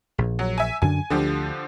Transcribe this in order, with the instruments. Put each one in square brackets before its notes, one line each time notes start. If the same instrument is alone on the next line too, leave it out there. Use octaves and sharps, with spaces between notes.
[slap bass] A#1
[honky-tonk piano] F#3
E5 G#5
[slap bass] F#2 D3 D4 [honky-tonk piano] G#5
[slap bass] D2 [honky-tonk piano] D3 F3 G4